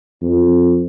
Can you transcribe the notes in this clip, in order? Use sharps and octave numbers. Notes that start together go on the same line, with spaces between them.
F2